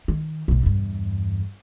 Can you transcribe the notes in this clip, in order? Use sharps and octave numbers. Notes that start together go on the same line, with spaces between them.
D#3
B1 A2
E2 G2